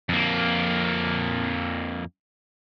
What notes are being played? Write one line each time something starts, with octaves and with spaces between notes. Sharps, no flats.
F2 A#3